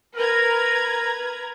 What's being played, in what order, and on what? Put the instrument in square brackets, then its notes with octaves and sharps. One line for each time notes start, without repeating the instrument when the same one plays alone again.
[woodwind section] A#4 [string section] B4 A#5 G#6